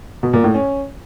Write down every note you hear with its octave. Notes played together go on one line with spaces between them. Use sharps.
B2
A#2
A2
C#4